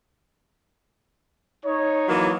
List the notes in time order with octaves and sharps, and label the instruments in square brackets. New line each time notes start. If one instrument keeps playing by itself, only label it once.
[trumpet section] D#4 C#5
[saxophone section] E3 F#3 A#3